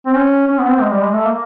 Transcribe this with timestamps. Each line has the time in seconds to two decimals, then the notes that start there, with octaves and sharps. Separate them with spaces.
0.06 C4
0.14 C#4
0.47 C#4
0.58 B3
0.69 C4
0.81 G#3
0.91 G3
1.03 G#3
1.13 A3
1.25 A#3